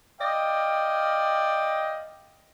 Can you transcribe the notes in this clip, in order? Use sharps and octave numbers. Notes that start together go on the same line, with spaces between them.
D5 D#5 F5 G5